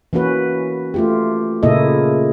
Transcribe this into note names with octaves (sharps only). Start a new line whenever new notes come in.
E3 A#3 C#4 F#4 B4
A3 F4 G4
A#2 C#3 A#3 E4 A4 D#5